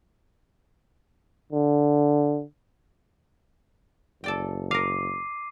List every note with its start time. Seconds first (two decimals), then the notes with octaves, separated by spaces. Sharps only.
1.52 D3
4.24 F#1 A4 D5 G5
4.71 A#4 F5 D6 C7 D#7